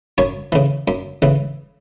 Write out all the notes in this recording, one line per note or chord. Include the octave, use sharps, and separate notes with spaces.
F#2 C#5
C#3 E3
F#2
C#3 E3